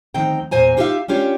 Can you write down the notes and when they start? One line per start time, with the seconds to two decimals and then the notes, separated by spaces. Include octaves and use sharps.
0.14 D2 D#3 F3 C4 G5 A#5
0.51 E2 A#2 C5 G#5 A#5
0.77 D#4 F4 G4 C5 E5 F5
1.08 C#4 D4 F4 G4 C#5